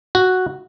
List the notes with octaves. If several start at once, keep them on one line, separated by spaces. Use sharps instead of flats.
F#4